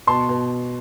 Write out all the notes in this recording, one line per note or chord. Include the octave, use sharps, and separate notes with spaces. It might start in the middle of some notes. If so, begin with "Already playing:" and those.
B2 A5 C6
B2